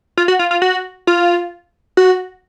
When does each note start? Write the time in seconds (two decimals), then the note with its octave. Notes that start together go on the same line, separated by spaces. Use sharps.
0.17 F4
0.28 F#4
0.39 F4
0.51 F4
0.62 F#4
1.07 F4
1.97 F#4